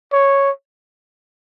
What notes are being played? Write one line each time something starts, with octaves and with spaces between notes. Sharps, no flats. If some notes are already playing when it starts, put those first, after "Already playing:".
C#5